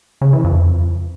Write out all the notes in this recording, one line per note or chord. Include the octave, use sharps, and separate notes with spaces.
C#3
E3
F2